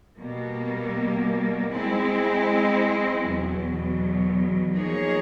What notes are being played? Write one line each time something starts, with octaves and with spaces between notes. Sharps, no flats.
B2 G3 A#3
G#3 C4 E4
E2 B2 F#3
F3 A#3 D#4 G#4 C#5